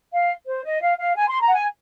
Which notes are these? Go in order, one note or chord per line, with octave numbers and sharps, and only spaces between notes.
F5
C5
D#5
F5
F5
G#5
C6
A#5
F#5
G#5